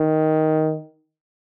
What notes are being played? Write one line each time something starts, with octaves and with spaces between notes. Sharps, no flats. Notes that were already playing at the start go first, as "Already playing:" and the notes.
Already playing: D#3